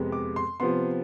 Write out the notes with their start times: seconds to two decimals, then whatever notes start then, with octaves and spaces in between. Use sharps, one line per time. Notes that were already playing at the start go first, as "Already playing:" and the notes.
Already playing: F2 C3 G#3 B3
0.12 D6
0.36 C6
0.60 C3 F3 B3 C6